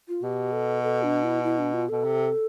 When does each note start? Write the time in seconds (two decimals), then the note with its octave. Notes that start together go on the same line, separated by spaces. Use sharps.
0.08 F4
0.23 B2 G4
0.53 A4
0.83 A4
1.03 D4
1.24 E4
1.44 E4
1.59 D4
1.73 F4
1.89 B2 A4
2.04 C3